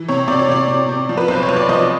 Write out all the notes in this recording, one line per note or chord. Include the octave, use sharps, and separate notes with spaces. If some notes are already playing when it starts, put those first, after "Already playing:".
Already playing: E3
C3 C#5
C3 D5
C#5
C3 D5
C3
C3
F3
B4
B1 C5
C#5
B1
D5
F3 D#5